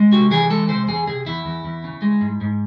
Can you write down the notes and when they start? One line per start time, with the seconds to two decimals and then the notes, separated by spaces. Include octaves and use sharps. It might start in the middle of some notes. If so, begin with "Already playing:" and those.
Already playing: G#3
0.12 C3 F#4
0.31 E3 G#4
0.50 G#3 A4
0.69 C3 C5
0.88 E2 G#4
1.07 C3 G#4
1.26 E2 E4
1.46 E2
1.65 E2
1.84 C#3
2.02 G#3
2.21 G#2
2.41 G#2